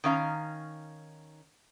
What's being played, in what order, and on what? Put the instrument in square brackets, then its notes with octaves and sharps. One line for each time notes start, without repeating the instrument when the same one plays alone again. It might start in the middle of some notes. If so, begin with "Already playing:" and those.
[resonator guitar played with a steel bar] D#3 C#4 F5 A#5